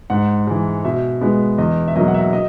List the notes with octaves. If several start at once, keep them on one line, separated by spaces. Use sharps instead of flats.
G#2 F#5
E3 G#3
B2 E5
G#3 B3
E2 D#5
E5
B2 F#3 A#3 D#5
F#5
E5
D#5